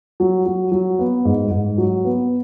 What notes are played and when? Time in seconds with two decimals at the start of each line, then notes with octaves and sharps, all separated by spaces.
0.20 F#3
0.46 F#3
0.72 F#3
0.99 B3
1.25 G#2
1.51 G#2
1.78 F#3
2.04 B3